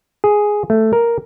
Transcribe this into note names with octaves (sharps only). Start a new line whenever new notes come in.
G#4
A3
A#4